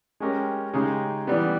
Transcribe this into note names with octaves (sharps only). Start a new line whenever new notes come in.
G#3 C#4 G4 A#4
C#3 G#3 D#4 G4
E3 G3 B3